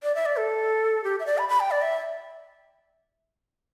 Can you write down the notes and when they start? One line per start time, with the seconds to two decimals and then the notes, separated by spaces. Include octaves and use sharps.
0.03 D5
0.15 E5
0.26 D5
0.37 A4
1.04 G4
1.20 E5
1.26 D5
1.38 B5
1.49 B5
1.60 G5
1.71 D5
1.82 E5